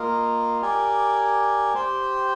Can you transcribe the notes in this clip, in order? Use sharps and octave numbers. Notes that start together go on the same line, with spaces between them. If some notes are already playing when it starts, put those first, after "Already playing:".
Already playing: A#3 F4 A#4 D#5
G4 A#4 D5 G#5
G4 C5 G5